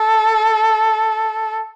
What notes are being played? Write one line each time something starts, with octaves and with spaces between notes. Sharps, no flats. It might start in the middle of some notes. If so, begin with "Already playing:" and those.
Already playing: A4